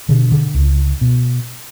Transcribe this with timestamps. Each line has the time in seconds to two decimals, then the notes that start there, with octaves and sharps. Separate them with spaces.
0.09 B2 D3
0.32 D3
0.54 C#2
1.01 B2